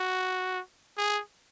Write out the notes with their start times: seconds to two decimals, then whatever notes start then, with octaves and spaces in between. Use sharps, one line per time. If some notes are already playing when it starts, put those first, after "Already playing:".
Already playing: F#4
0.98 G#4